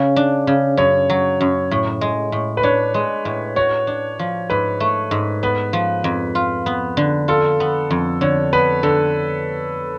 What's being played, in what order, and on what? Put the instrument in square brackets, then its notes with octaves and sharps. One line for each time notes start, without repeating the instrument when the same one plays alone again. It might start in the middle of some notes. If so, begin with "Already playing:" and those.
Already playing: [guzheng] C#3
D4
C#3
[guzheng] F#2 [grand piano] C#5
[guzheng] F#3
F#2
A2
G#3
A2
[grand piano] B4
[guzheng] D4 [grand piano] C#5
[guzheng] G#3
A2
[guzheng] F#4 [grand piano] C#5
[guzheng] D4
F3
[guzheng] G#2 [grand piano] B4
[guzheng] A3
G#2
[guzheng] B3 [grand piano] B4
[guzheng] F3
F2
F4
B3
D3
[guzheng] F4 [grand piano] A4
[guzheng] B3
F2
[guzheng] D3 [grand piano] C#5
[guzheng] B3 [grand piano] B4
[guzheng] D3 [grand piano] A4